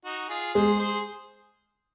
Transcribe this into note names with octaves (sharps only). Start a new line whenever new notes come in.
D#4 F#4
F4 G#4
G#3 G#4 C5
G#4 C5